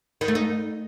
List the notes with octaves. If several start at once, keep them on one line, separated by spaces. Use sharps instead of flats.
D#3
A3
D#4